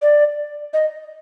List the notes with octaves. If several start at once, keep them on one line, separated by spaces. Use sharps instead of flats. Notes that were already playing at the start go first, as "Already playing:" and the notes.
D5
D#5